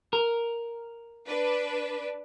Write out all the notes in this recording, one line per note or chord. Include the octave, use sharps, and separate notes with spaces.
A#4
D4 B4